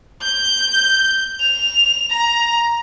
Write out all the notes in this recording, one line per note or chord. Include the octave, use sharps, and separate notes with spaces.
G6
F7
A#5